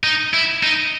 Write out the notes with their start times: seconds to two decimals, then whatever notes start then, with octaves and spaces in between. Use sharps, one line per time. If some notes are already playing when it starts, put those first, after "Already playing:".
0.04 D#4
0.34 E4
0.63 D#4